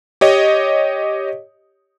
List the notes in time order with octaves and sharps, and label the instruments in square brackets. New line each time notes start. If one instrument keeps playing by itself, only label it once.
[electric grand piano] G4 C#5 D#5